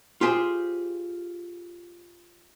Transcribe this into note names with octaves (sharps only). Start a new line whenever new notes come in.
F4 G4 G#4 C5